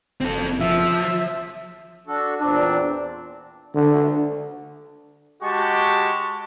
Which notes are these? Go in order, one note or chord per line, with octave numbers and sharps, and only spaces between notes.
F#1 C4 A4
F3 E5
D4 F#4 A4
E2 A#2 C4 D4
D3
G#3 F#4 G4 A5 C#6